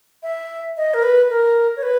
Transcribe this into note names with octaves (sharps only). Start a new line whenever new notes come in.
E5
D#5
A#4
B4
A#4
C#5
B4